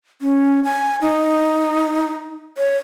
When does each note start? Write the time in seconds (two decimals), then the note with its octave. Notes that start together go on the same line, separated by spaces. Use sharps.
0.22 C#4
0.64 G#5
1.02 D#4
2.58 C#5